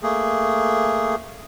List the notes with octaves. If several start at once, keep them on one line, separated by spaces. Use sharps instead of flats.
A3 A#3 G#4